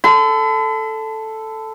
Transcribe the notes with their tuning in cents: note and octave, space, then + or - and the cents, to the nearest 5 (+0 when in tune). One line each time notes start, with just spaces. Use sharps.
A4 +0 B5 +45